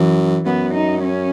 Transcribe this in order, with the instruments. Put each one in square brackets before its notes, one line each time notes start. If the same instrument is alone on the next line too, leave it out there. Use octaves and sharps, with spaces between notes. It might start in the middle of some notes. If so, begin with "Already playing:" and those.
Already playing: [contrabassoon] F#2 [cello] E3
[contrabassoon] F#2 [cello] B3
[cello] D#4
C#4